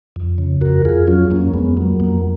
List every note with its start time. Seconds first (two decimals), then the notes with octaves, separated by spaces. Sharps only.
0.16 F2
0.38 C#3
0.61 F2 F#4 A#4
0.85 F2 F4 G#4
1.07 F#3 C#4 F4
1.31 F2 A#3 C#4
1.54 F2 G#3 B3
1.77 F#3 A#3
2.00 F2 A#3